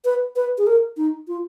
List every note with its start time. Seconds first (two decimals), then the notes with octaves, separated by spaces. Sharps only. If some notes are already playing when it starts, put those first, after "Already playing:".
0.05 B4
0.36 B4
0.58 G#4
0.67 A#4
0.97 D#4
1.28 F4